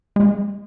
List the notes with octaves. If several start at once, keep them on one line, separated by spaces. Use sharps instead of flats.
G#3